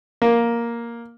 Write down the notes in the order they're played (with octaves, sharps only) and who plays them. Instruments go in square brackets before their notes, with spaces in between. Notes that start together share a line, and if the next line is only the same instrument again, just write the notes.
[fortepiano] A#3